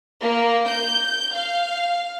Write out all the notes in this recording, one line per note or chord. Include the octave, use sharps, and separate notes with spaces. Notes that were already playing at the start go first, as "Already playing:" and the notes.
A#3
G6
F5